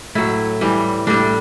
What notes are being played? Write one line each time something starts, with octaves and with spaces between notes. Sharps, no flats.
A2 F#3 E4
A2 E3 G3
A2 G3 D4